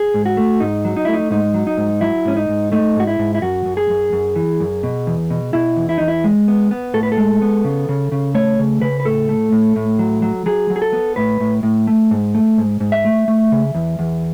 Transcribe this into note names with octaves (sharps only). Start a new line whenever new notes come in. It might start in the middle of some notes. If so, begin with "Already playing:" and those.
Already playing: G#4
G#2
F#4
A3
G#2 D#4
F#3
D#4
A3 E4
D#4
G#2 D#4
F#3
D#4
G#2
F#3 E4
G#2 C#4
D#4
G#2
A3 D#4
G#2 F#4
E4
G#2
E4
F#2 F#4
F#2
G#4
F#2
F#2
E3
F#2
B2
E2
B2
B2 E4
E2
E4
E2 D#4
E4
G#3
B3
B3
A2 A4
B4
A4
G#3
B3
C#3
C#3
C#3
A3 C#5
C#3
C#3 B4
B4
A2 A4
A3
A2
A2
F#3
F#3
F#3 G#4
F#3
G#4
A4
B3
A2 B4
A2
A2
A3
G#2
A3
G#2
G#2
E5
A3
A3
C#3
E2
E2